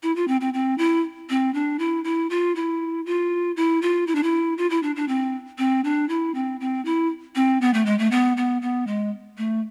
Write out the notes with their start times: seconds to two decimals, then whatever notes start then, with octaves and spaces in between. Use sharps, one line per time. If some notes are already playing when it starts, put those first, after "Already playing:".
0.03 E4
0.16 F4
0.28 C4
0.41 C4
0.54 C4
0.78 E4
1.30 C4
1.54 D4
1.79 E4
2.04 E4
2.30 F4
2.56 E4
3.06 F4
3.57 E4
3.82 F4
4.07 E4
4.15 D4
4.23 E4
4.58 F4
4.70 E4
4.83 D4
4.96 D4
5.08 C4
5.58 C4
5.84 D4
6.09 E4
6.35 C4
6.60 C4
6.85 E4
7.35 C4
7.61 B3
7.74 A3
7.86 G#3
7.99 A3
8.11 B3
8.37 B3
8.62 B3
8.87 G#3
9.38 A3